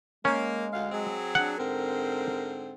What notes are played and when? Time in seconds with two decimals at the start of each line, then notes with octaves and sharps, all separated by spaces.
0.25 G#3 A#3 C#4
0.72 D2 F5
0.92 F#3 C4 G#4
1.35 D4 F#5
1.58 G#2 D3 C4 A#4